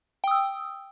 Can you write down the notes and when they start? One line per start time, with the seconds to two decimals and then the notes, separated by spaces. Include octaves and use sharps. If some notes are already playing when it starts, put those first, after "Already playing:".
0.24 G5
0.28 D#6
0.31 E6